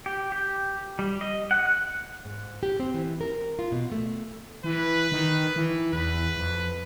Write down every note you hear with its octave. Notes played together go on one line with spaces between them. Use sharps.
G4
G4
G3
D#5
F#5
F#6
G#2
G4
C4
E3
A#4
F4
B2
A3
E3 B4
D#3
E3
E2 B4
F2